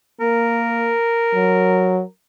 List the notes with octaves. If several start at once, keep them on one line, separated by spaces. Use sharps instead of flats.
A#3 A#4
F#3